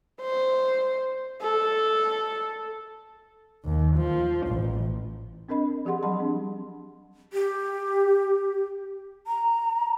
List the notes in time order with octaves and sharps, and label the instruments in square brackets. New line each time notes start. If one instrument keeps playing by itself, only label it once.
[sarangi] C5
A4
[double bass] D#2
F3
A1
[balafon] C4 D4 A#4 D#5 B5
F3 G4 G#4 F#5 C6
F#3 G3 F#5 A5 B5 C6
C4 D4
[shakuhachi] G4
A#5